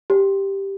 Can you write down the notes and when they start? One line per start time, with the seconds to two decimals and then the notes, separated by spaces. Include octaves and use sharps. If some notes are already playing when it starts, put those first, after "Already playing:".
0.10 G4